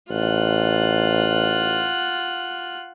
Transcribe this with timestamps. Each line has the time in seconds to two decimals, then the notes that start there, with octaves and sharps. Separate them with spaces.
0.10 A1 F4 F#5